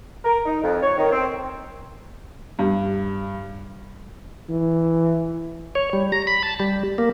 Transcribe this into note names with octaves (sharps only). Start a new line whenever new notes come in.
A#4
D#4
F2
C#5
D#3
C4
G2
E3
C#5
G3
A#5
B5
A5
G3
A#3